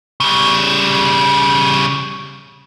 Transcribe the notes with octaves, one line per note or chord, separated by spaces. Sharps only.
C#3 G3